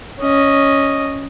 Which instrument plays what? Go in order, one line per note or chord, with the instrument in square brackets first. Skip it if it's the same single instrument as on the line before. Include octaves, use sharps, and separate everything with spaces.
[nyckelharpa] C#4 D#5